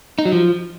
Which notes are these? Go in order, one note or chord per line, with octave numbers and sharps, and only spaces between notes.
D#4
F#3
F3